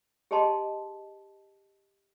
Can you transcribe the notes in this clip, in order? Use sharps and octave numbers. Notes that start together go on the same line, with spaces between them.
G4 G#4 D#5 A5 C6